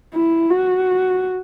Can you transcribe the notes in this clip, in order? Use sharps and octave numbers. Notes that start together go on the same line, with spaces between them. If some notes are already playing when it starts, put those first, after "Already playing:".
E4
F#4